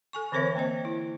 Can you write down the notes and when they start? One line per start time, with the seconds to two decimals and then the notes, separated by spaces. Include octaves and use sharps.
0.13 A4 G#5 C#6
0.32 D3 E3 C4 A#4 C#5 E5
0.56 A#3 C4 C5 D#5
0.85 E4